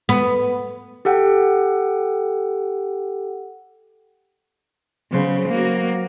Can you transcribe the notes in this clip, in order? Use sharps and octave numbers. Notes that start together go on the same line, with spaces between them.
B3
G4 A4 F#5 G5
C#3 F#3 B3 C5
A#3 F#4